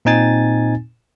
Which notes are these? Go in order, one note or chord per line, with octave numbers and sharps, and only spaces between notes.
A#2 C4 D#4 G#5 A6